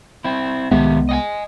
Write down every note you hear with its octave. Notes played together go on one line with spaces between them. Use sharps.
C4 E4
C2 D#3 G#3 B3 G4 E5
D#5 F#5 G#5